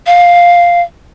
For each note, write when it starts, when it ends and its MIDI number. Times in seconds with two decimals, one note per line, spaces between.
0.07 0.82 77